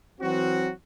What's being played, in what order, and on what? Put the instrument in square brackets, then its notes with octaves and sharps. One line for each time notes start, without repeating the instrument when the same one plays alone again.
[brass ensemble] E3 F#3 C4 F#4